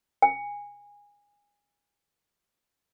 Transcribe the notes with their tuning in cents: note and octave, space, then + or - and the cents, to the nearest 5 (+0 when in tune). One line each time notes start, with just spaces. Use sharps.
G#5 -20